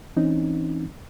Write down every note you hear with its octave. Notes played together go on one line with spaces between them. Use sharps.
E3 C4 C#4 D#4